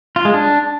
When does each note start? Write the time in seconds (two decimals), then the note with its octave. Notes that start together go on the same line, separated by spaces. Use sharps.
0.16 F4
0.25 G#3
0.34 D4